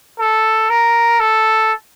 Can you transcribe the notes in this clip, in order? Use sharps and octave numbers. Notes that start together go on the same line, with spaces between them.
A4
A#4
A4